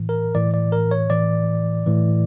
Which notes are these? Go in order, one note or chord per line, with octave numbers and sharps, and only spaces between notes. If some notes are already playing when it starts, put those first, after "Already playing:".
Already playing: A2 E3
A#4
A2 E3 D5
D5
A#4
C#5
A2 E3 D5
A2 E3